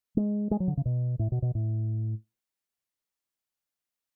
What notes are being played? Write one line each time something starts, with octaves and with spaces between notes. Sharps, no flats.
G#3
G#3
F#3
D3
C#3
B2
A2
B2
B2
A2